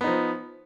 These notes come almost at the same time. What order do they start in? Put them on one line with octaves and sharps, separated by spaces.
B3 D#4 F3